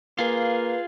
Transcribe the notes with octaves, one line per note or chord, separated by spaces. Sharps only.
A#3 F4 G#4 B4